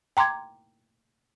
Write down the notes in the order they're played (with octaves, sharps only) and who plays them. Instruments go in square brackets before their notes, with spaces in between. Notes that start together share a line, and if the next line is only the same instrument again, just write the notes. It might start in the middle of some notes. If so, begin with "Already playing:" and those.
[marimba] G5 A#5 C6 D6 G#6